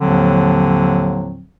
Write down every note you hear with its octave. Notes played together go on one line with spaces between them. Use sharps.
D#2 A2 D3 F3 F#3 C4